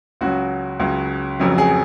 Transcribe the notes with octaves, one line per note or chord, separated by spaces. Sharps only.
C#2 C#3 F#3 F#4
C#2 C#3 F#3
F1 F2 C#3 F#3
G#4